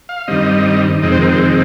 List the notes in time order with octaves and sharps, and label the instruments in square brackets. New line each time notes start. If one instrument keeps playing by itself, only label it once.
[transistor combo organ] F5
G2 D#3 G3 C4 D#5
F2 C3 D#3 G#3 C4 D#5
C5
A#4
C5